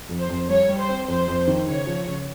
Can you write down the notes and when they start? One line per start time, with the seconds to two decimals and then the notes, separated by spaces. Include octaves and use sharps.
0.09 F2
0.20 C5
0.29 F2
0.49 G3 C#5
0.69 G3
0.78 C5
0.89 C4
1.08 F2 C5
1.28 F2
1.48 D#3
1.67 C#3 C#5
1.87 F3
2.07 C#3